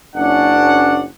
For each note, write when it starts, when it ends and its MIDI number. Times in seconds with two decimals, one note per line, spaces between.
0.16 1.04 30
0.16 1.04 61
0.16 1.04 62
0.16 1.04 78